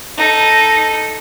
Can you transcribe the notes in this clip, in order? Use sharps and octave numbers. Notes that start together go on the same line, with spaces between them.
D#4 A4